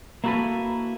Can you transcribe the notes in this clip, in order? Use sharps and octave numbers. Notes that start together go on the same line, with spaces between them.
A#3 E4 F#4 G4 A4 B4